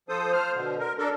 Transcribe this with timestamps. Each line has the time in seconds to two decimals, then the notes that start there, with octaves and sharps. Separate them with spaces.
0.09 F3 A4 C5 D#6
0.33 C5 F6
0.55 B2 D3
0.79 A#4
0.98 D4 A4 A#4